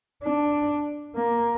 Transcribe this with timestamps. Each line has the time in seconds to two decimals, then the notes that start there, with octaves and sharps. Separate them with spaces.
0.24 D4
1.16 A#3